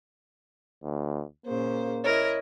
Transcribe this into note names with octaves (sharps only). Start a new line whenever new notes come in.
D2
A#2 C#3 A#3 C5
E4 A#4 C#5 D#5